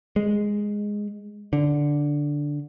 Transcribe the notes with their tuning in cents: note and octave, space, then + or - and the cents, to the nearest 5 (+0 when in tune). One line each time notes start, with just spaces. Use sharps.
G#3 -5
D3 -5